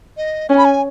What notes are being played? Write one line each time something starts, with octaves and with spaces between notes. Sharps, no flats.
D#5
C#4 G#5
B5
G#5